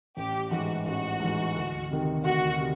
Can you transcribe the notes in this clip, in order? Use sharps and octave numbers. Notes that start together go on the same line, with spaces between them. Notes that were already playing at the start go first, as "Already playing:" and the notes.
A1 G4
G#2 E3 F#4
A1 F#4
G#2 E3
D2
C3 D#3
D2 F#4
C3